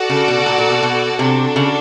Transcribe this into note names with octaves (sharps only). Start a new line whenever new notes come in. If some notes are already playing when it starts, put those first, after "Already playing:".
Already playing: F#4 A4 D5 F#5
C#3
B2
A#2
A#2
B2
B2
C3 D4 F#4 A4
C#3